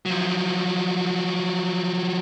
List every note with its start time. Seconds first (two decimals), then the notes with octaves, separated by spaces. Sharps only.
0.06 F3 F#3